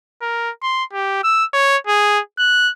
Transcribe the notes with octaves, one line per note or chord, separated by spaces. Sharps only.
A#4
C6
G4
E6
C#5
G#4
F#6